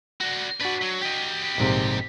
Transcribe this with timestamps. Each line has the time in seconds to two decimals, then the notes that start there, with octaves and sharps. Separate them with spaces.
0.21 D4 F#4
0.61 D4 F#4 B4 D5
0.82 F#3
1.02 G4 D#5
1.58 A#1 G#2 C3